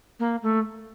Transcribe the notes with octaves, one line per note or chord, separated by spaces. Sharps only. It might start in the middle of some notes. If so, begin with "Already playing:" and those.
A#3
A3